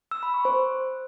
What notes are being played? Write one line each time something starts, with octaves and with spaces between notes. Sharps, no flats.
E6
B5
C#6
C5